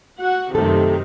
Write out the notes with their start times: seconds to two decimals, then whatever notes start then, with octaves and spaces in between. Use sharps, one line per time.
0.19 F#4 F#5
0.55 F#2 C3 D#3 A3 A4